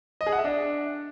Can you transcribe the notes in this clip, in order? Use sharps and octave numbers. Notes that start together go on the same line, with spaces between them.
D#5
G#4
F#5
E5
D4